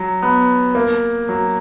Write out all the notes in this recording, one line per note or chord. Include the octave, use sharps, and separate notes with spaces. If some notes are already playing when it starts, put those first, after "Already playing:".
Already playing: F#3
B3
A#3
F#3